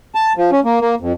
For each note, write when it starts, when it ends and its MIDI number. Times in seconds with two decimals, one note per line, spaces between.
0.15 0.33 81
0.37 0.50 53
0.52 0.60 61
0.65 0.80 58
0.81 0.95 58
1.00 1.13 41